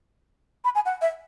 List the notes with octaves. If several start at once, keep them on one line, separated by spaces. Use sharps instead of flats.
B5
G#5
F#5
E5